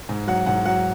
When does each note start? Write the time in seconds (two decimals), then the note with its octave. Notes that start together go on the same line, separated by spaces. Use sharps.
0.09 G#2
0.27 F#3 F#5
0.46 G#2 F#5
0.66 F#3 F#5